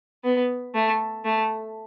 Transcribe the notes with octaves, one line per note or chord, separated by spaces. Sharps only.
B3
A3
A3